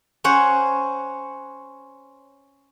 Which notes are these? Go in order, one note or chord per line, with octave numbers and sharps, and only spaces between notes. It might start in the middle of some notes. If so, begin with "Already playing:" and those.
C#4 C5 C#5 F#5